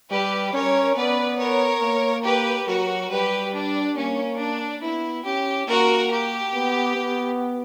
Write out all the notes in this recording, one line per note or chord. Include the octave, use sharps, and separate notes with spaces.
G3 G4 B4
C#4 A#4 C#5
B3 B4 D5
A#4 C#5
A#3
G4 B4
F#3 F#4 A#4
G3 G4 B4
D4
A#3 C#4
D4
B3 E4
C#4 G4
A#3 F#4 A#4
G4
B3
B3